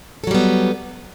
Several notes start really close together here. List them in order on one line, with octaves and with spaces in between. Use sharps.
A4 F#3 G3 B3